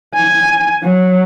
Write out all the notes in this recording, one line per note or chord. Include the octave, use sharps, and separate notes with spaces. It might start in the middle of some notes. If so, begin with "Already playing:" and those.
G#5
F#3